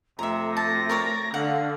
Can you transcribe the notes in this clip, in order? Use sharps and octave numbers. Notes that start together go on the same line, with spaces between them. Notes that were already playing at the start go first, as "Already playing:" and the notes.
F2 C3 A3 E5 A#5
A5 A#6
A#4 C#5 D5
D3 F5 F#5